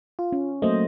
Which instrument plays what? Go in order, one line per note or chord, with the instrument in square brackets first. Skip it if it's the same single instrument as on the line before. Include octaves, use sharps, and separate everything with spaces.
[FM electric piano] F4
[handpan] C#4
[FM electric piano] F#3 A3 [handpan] A#3 C5 D#5